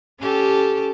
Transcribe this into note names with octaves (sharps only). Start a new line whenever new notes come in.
C#4 G4 A4